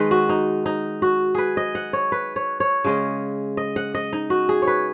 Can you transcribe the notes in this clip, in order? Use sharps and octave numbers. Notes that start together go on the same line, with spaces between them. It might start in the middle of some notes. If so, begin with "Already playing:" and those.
Already playing: D#3 G#3 D#4 B4
F#4
D#4
D#4
F#4
G#4 B4
D#5
F#5
C#5
B4
C#5
C#5
C#3 G#3 C#4
D#5
F#5
D#5
D#4
F#4
G#4
C#5
B4